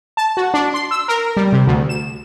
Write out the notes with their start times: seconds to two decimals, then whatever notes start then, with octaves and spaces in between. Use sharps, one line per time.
0.17 A5
0.37 F#4
0.54 D4
0.74 C6
0.91 E6
1.08 A#4
1.37 G3
1.52 C3
1.67 D2
1.89 E7